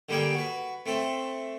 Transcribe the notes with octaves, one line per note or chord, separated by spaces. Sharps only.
D3 G3 A#3 G#4 G5
F#4 B4
A3 C4 A4